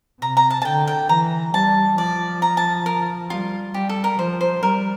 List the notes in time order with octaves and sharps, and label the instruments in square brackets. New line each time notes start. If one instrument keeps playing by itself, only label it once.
[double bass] C3 [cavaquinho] A#5
[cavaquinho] A#5
A5
A5
[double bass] D3 [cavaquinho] G5
[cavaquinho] G5
[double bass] E3 [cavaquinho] A#5
[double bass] G3 [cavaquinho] A5
[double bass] F3 [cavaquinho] D5
[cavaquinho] A#5
A5
A#4
[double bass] G3 [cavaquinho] F4
[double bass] G3 [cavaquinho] G4
[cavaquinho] A4
A#4
[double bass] F3 [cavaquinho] C5
[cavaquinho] C5
[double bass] G3 [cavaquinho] A#4